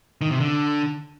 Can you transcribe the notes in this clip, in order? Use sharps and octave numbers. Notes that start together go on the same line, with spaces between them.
D#3
C3
D3